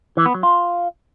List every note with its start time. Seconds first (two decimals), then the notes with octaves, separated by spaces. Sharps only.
0.17 E3
0.26 B3
0.34 F#3
0.43 F4